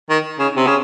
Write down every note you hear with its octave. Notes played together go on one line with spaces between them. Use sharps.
D#3
C#3
C3
C#3